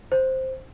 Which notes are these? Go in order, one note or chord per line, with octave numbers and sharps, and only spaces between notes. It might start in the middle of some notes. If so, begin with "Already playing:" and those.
C5